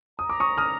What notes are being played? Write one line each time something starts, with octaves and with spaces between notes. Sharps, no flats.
A#5 D#6
D6
C#6 D#6
D#6 F6